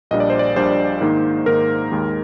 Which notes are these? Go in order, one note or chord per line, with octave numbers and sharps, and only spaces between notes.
A#1 A#2 G3 D4 D#5
D5
C5
D5
A#1 A#2 G3 D4 C5
G#2 D#3 A#3 D#4
G#2 D#3 A#3 D#4 A#4
D#2 D#3 G#3